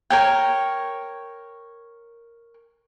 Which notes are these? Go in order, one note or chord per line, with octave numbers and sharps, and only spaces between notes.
A#4 C#5 G5